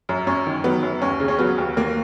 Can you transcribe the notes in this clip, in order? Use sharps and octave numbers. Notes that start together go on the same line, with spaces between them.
F#2
F#2 C#4
D#3
F#3 B3
F#2
D#2 C#4
C#3
C#4
F#3 B3
D#2
D#2 A#3